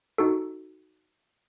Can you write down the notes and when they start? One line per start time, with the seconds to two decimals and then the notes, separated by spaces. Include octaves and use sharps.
0.18 D#4 F#4 A4